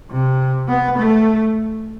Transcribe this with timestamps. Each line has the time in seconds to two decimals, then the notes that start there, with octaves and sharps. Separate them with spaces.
0.10 C3
0.68 B3
0.98 A3